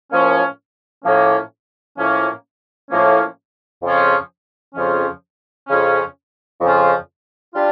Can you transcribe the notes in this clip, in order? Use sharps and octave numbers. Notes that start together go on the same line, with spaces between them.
A2 F3 A#3 C#4
A2 F3 A#3 C#4
A2 F3 A#3 C#4
A2 F3 A#3 C#4
F2 C#3 F3 C#4
F2 C#3 F3 C#4
F2 C#3 F3 C#4
F2 C#3 F3 C#4
G3 D4 F4